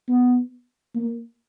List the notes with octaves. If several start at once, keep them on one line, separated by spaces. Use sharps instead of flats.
B3
A#3